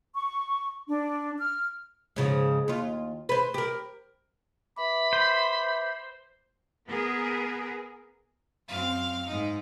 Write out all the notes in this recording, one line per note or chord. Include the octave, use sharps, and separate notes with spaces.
C#6
D4
F6
G#2 C#3 F3
D#2 F4
B4 C5
G4 A#4
B4 E5 B5 D6
C5
B3 G#4 A#4
F#2 C4 F5
G#2 D#4